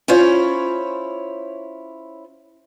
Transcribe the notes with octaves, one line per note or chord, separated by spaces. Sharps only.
C#4 E4 F4 C5 C#5